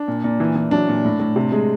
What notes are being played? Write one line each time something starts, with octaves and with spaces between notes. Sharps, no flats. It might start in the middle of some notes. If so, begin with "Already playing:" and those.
Already playing: D4
A#2
A#2
E3
E3
F#3 D4
A#2
A2
A2
C3
G#3